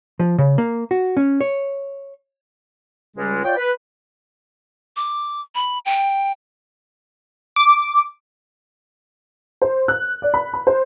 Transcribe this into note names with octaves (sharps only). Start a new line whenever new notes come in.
F3
C#3
A#3
F#4
C#4
C#5
C#2 G3 G#3
F4 C#5 D5 G5
B4
D6
B5
G5
D6
C5
F#6
D5
B5
B5
C5